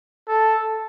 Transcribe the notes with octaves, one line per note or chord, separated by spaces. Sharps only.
A4